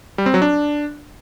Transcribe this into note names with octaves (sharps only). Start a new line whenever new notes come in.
G3
C4
F#3
D4